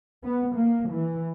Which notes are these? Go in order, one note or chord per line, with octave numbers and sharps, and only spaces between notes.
B3
A#3
E3